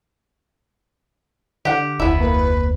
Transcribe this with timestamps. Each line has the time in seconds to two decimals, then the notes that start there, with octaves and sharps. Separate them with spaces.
1.65 D3 G4 F#5
2.00 F1 D2 B3 E4
2.20 A#3 B4